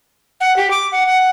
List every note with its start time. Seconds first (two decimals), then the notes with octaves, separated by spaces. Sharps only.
0.41 F#5
0.56 G4
0.71 D6
0.92 F#5
1.06 F#5